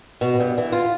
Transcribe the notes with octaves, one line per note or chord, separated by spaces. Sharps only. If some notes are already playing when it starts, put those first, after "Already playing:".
B2
G2
E3
F4